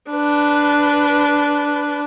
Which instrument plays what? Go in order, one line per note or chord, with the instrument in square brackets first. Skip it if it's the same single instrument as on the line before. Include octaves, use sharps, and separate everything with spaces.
[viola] D4 B4